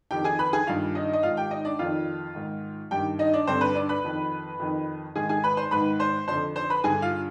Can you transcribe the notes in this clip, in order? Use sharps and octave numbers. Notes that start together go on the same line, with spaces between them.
F2 D#3 G4 G5
G#4 G#5
B4 B5
G#4 G#5
G2 D#3 F4 F5
D#4 D#5
D#5
G#2 D#3 F4 F5
G4 G5
D#4 D#5
D4 D5
F2 D#3 F4 F5
G#2 D#3
G2 D#3 G4 G5
D#4 D#5
D4 D5
G2 D3 C4 C5
B4
D4 D5
B4 B5
F2 D#3
F2 D#3
G#2 D#3 G#4 G#5
G#4 G#5
B4 B5
C5 C6
G#2 D#3 B4 B5
C5 C6
F2 D3 C5 C6
C5 C6
B4 B5
G2 D3 G#4 G#5
F4 F5